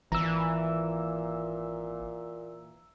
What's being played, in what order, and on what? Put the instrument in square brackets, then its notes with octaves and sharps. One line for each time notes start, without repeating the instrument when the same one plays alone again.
[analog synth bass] G#1 [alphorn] A#2 [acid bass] E3 [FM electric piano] A#5 E6